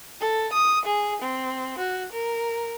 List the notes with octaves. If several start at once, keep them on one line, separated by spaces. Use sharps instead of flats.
A4
D#6
G#4
C4
F#4
A#4